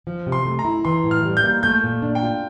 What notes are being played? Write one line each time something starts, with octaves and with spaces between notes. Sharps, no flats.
F3
C3
C6
A3
A#5
E4
E3 C6
A2
F6
G3
G6
A#3
A3 G6
A#2
D4
G5
F4